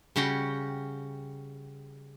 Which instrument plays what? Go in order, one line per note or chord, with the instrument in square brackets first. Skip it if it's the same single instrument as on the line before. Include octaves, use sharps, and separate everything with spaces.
[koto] C#3 G3 C#4 F#4 F#5 G5